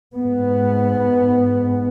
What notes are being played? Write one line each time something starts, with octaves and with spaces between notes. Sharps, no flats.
G#2 B3